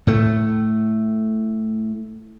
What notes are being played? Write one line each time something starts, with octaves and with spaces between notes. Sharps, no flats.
A2 A3